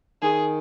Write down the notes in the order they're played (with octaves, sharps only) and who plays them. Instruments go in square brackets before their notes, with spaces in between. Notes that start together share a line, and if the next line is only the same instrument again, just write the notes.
[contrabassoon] D#3 [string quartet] G#4